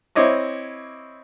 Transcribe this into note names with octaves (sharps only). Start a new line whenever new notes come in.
C4 E4 C#5 D#5 D6